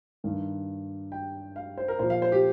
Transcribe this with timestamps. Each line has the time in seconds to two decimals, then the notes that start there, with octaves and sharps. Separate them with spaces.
0.24 G2 D#3
1.12 G5
1.56 F5
1.78 C5
1.88 A#4
1.99 A#2 F3 C5
2.10 F5
2.22 C5
2.32 G4